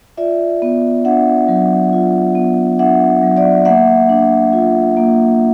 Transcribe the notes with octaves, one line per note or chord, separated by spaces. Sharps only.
F4 D5 E5
B3
D4 E5 F#5
F#3
F4
B3
D4 E5 F#5
F#3
D5 E5
A#3 E5 F#5
D4
F4
A#3